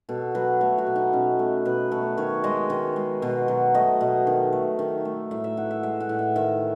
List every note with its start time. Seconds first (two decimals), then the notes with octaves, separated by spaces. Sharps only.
0.09 B2 A4
0.35 F#3 B4
0.61 A3 C#5
0.78 F#4
0.87 B2
0.96 D#4
1.13 B2 C#4
1.39 A3
1.65 B2 B4
1.92 A3 B4
2.18 D#3 C#5
2.44 G#3 D#5
2.70 D#3
2.96 G#3
3.22 B2
3.48 F#3
3.74 A3 D#5
4.01 B2 D#5
4.27 D#3
4.53 A3
4.79 D#3
5.05 A3
5.31 A2 E5
5.44 E5
5.57 E3 F#5
5.71 E5
5.83 G#3 E5
6.00 F#5
6.09 A2
6.19 E5
6.36 D#3 E5